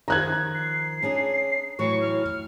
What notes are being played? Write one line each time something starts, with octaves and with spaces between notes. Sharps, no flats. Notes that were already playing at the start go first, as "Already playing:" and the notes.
D#3 F3 A#5 F#6 G#6
C7
C#4 D4 G#4
A2 E3 F#3 C#6
F6